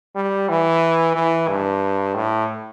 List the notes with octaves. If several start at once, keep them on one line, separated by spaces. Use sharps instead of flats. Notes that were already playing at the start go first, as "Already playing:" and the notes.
G3
E3
E3
G2
A2